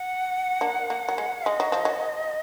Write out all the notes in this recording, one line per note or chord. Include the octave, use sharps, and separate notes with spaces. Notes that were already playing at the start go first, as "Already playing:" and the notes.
Already playing: F#5
A#3 D4
A#3
F#3
G#3
G#3 D#5
F#3
F3
F#3